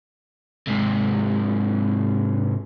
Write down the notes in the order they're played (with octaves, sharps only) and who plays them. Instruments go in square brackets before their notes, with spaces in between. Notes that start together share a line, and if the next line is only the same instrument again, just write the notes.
[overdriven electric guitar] G#2 C3